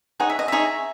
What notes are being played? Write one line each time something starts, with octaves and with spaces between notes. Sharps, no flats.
D#4 G#4 C#5 F#5
E5
D#5
D#4 G#4 C#5 E5